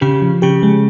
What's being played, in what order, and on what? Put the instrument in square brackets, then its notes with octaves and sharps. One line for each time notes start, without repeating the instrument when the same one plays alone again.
[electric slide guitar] C#3 [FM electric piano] G4
[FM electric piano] F3
[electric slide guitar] C#3 [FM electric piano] G4
[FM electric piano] G#3